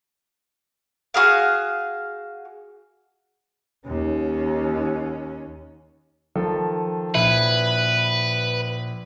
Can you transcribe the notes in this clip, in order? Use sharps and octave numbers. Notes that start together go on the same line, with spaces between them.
F#4 G#4 F5
D#2 C#4
D#3 F3 A4
A#1 E4 B4